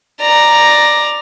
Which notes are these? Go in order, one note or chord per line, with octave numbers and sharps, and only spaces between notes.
D5 A#5